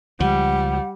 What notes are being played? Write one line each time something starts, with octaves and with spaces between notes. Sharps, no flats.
C#2 F3 G3 F#5